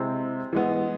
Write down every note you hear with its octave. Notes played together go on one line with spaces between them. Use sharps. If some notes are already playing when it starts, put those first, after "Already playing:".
Already playing: C3 G#3 C4 E4
E3 G#3 B3